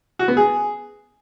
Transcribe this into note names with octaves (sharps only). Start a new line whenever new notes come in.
F#4
B3
G#4